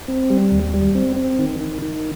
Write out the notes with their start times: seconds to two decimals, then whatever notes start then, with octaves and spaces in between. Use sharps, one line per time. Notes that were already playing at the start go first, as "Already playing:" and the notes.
0.08 C4
0.30 G3
0.51 D#2
0.74 G3
0.95 C4
1.16 C4
1.39 D#3
1.60 D#3
1.82 D#3